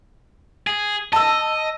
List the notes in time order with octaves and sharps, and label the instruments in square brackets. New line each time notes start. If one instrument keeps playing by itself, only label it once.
[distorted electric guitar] G#4
[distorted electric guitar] D#5 [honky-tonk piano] A5 E6